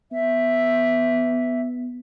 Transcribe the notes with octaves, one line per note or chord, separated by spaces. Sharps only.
B3 E5